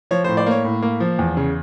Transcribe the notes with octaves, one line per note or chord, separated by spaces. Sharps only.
F3 C#5
A2 C5
C5 D5
A#3 C#5
A2
A#3
F3
E2
C#3